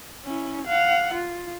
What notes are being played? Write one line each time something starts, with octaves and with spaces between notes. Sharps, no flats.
C#4 E4
F5 F#5
F4